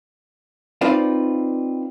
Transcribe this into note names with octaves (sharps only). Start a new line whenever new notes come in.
C4 D#4 F4 B4 D5 F5